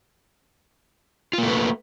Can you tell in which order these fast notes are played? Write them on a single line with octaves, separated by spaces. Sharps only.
F4 A#3 A3 B4